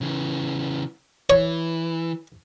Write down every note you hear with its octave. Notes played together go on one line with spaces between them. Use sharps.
C#3 E3
E3 C#5